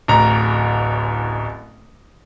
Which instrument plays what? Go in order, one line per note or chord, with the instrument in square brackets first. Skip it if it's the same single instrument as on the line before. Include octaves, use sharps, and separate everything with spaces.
[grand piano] D1 A1 A#5